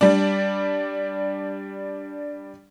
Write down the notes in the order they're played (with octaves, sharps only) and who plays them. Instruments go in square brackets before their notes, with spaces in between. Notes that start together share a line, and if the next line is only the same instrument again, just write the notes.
[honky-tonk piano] G3 D4